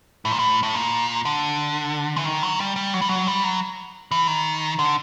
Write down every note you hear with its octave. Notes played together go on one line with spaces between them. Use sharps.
A2
A#2
A2
A2
A#2
D3
E3
D#3
F#3
G3
G3
F#3
G3
F#3
G3
F#3
E3
D#3
D3